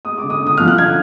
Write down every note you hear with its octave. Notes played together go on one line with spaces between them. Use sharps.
G#3 D#6
D6
D3
D#6
D3
D#6
F3 F6
F#6
D3 G#6